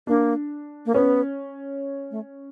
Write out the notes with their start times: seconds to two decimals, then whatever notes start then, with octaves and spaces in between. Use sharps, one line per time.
0.07 A#3 D4
0.86 A#3
0.94 B3 C#4
2.11 A3